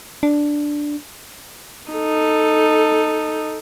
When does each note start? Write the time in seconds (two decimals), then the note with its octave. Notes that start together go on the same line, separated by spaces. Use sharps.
0.23 D4
1.91 D#4 A4